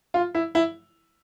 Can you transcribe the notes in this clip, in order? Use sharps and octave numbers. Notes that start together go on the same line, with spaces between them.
F4
E4
E4